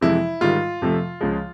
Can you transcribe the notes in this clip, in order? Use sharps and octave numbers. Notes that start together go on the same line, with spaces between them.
F2 C3 E3 G#3 E4
G#2 D#3 G3 F4
F2 C3 F3 A3
C#2 C#3 F3 G#3